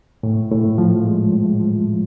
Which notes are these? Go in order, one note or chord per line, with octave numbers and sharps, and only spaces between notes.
A2
A2
F3
G#3
A2
F3